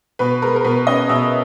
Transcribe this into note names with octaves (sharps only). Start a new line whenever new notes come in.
B2 B4
G#3 A#4
A#4
B2 B4
C#4 D#5
B2 E5